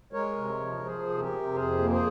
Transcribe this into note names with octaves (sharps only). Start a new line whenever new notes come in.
G#3 A#4 C#5
C3
F3
F3 G#4 C5
C3
G4 A#4
C3
F2 G#4 C5
A#3
G#4 C5